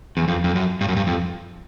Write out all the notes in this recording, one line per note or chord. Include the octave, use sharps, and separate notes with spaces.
E2
F2
F2
F#2
G2
F#2
G2
F2